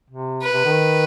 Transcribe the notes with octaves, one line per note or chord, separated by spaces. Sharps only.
C3
B4
C3
D#3